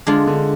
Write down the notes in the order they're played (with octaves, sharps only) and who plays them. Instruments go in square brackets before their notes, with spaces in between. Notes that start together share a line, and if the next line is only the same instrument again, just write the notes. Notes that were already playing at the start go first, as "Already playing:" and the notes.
[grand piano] D3 [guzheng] G#3 D4 F4
[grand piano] D3